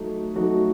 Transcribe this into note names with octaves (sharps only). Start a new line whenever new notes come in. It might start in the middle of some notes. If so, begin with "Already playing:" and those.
Already playing: F#3 A3 D#4 F#4
F#3 A3 D#4 F#4